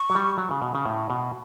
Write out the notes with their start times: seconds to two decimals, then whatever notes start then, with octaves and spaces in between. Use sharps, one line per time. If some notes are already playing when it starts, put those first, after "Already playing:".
Already playing: C#6
0.10 F#3
0.15 G3
0.38 F#3
0.51 C#3
0.62 B2
0.75 C#3
0.86 A2
1.10 B2